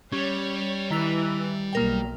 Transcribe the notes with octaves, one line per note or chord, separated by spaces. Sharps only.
G3 C#4 C#5
D#3 E3 E4 F7
B1 A#3 A#4 G5